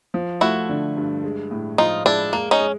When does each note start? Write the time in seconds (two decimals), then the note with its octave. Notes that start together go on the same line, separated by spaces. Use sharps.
0.14 F3
0.41 A3 E4 F#4
0.69 D3
0.97 G2
1.24 G#3
1.51 A2
1.78 F3 D#4 F4
2.05 G#3 D4 E4
2.33 G#3 A#3
2.51 C#4 D#4
2.60 G#3